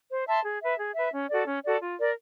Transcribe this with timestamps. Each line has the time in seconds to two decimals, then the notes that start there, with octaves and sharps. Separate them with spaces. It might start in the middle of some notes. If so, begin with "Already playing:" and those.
0.09 C5
0.27 E5 A5 C6
0.44 G#4
0.61 B4 E5
0.78 G#4
0.95 B4 E5
1.12 C#4
1.29 F#4 A4 D5
1.46 C#4
1.63 F#4 A4 D5
1.80 F4
1.98 A#4 D5